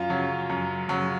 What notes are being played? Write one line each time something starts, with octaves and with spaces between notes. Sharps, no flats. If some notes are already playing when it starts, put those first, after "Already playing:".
Already playing: F#2 F4
C#3 F#3
F#2
C#3 F#3